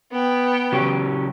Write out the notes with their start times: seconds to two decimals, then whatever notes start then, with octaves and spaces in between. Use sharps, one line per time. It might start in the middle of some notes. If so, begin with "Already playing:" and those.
0.12 B3 G5
0.72 C#3 F#3 G4